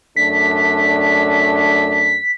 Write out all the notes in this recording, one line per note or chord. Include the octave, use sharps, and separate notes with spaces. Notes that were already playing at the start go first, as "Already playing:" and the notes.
F#2 A3 D4 B6